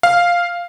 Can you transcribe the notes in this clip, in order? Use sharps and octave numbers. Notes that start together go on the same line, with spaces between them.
F5